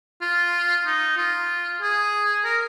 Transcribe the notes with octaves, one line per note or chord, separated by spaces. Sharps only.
F4
D#4
F4
G#4
A#4